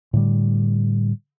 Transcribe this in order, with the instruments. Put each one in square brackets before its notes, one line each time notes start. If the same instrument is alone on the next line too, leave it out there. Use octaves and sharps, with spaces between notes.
[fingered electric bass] A2 D3 G3